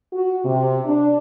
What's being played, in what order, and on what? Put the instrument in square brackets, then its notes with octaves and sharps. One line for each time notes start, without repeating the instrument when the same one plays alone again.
[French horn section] F#4
C3
D4